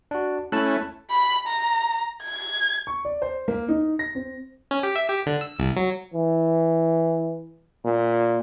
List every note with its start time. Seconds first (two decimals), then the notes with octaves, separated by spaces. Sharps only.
0.11 D4 F#4
0.52 A3 C#4 E4 A5 F#6
1.10 B5
1.48 A#5
2.23 G#6
2.87 C#6
3.05 D5
3.22 C5
3.48 A#3
3.68 D#4
3.99 A#6
4.15 C4
4.71 C#4
4.83 G4
4.96 E5
5.09 G4
5.26 D3
5.41 E6
5.59 C2
5.77 F#3
6.14 E3
7.84 A#2